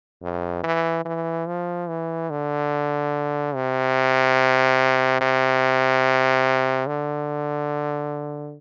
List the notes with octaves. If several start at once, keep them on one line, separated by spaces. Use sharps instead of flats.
F2
E3
E3
F3
E3
D3
C3
C3
D3